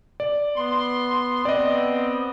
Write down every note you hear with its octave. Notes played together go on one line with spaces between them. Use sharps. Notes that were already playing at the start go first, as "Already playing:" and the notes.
D5
B3 C6
B3 C4 D5 D#5